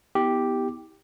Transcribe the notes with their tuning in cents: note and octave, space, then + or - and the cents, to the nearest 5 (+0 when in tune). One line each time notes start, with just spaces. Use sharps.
B3 +0 E4 -45 G4 +0